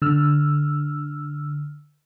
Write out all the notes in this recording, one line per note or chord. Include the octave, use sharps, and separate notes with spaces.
D3 E6 F6